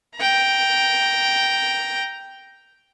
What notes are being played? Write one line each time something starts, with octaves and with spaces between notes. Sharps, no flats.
G5 A#5